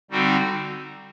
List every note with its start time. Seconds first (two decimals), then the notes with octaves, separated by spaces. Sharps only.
0.11 D3 G3 C4 D#4 F#4